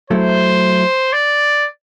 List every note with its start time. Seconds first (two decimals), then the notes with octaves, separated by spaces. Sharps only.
0.10 F#3 A3 E4 C5
1.13 D5